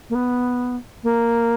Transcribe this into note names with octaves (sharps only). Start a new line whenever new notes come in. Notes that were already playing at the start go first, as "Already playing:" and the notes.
A#3
B3
A#3